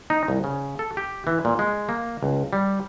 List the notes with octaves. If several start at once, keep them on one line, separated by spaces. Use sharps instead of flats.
D#4
C2
C#3
A4
G4
E3
A#2
G#3
A#3
C#2
G3